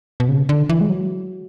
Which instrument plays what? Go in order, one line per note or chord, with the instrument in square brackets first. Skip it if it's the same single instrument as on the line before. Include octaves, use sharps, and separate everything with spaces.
[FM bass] B2
C#3
D3
E3
G#3
F#3